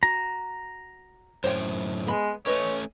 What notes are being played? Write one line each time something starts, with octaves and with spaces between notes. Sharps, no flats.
F#4 A#5
F#2 A2 C5 C#5 G5
G#3 B3 B5
A3 C#4 G4 B4 C#5 D#5